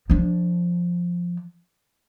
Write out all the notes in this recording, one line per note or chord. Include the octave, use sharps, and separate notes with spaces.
F3 D4